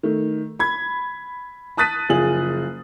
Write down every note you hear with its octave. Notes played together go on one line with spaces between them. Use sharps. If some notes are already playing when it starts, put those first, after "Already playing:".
D#3 A3
B5 G#6
A5 D#6 F#6 A6 B6 D#7
F#1 F3 G#4 F#7